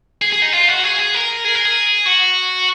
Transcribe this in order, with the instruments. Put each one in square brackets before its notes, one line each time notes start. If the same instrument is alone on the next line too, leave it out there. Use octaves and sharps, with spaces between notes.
[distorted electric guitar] G#4
G#4
D#4
F4
F#4
G#4
G#4
A#4
G#4
A#4
G#4
F#4